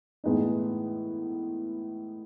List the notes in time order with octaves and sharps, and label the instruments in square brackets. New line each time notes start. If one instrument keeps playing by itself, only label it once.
[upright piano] A2 E3 G#3 B3 D#4